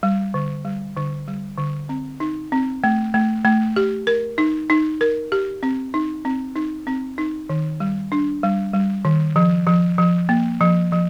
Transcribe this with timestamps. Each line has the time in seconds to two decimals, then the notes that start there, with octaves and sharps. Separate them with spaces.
0.03 G3
0.34 D3
0.65 G3
0.97 D3
1.28 G3
1.58 D3
1.89 C4
2.20 D#4
2.52 C4
2.84 A3
3.14 A3
3.45 A3
3.76 G4
4.07 A#4
4.38 D#4
4.70 D#4
5.01 A#4
5.32 G4
5.63 C4
5.94 D#4
6.25 C4
6.56 D#4
6.87 C4
7.18 D#4
7.49 D#3
7.80 G3
8.12 D4
8.43 G3
8.74 G3
9.05 D#3
9.36 F3
9.67 F3
9.98 F3
10.29 A#3
10.61 F3
10.92 F3